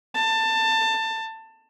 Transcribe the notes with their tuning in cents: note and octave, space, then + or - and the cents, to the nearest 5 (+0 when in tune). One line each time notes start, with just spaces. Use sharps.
A5 +20